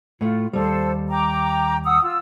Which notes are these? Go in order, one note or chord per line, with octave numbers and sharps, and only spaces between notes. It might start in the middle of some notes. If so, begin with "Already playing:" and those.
A2 A3 F4
D#2 G#2 G3 A4 C5
G5 A#5 D6
F#5 D#6 E6
F4 E6